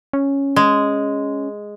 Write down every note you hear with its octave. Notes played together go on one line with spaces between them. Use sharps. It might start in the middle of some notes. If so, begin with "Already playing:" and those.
C#4
G#3